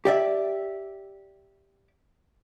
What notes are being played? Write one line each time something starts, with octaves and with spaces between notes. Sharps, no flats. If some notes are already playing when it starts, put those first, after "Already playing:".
G4 D5 E5